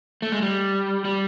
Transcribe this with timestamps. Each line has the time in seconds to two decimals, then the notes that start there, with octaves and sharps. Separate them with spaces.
0.22 A3
0.32 G#3
0.42 G3
1.05 G3